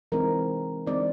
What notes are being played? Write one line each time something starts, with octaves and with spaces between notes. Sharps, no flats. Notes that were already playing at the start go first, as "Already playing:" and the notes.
E3 G#3 C4 D#4 A#4
E3 G#3 C4 D#4 D5